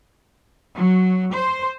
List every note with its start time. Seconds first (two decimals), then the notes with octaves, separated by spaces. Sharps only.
0.76 F#3
1.34 C5